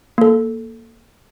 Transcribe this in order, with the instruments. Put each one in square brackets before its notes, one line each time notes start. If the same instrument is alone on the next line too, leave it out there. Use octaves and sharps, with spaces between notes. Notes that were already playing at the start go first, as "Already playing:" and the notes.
[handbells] A#3 A4